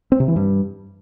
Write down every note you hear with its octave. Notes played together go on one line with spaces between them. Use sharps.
C4
C3
E3
G2